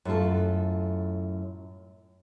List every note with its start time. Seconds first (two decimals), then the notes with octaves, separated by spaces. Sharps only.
0.05 F#2 A2 F4 A4